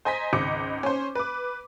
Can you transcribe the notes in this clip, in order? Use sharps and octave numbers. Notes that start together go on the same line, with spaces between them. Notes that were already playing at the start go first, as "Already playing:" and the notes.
C5 D#5 G#5 A#5 B6
G#1 C#2 D#5 D6 C#7
C#4 C5
B4 D6